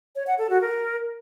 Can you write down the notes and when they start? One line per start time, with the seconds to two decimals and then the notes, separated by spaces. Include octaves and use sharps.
0.16 C#5
0.27 F#5
0.38 A4
0.50 F#4
0.61 A#4